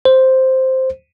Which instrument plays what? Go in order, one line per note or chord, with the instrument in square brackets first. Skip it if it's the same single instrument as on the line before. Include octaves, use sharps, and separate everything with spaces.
[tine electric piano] C5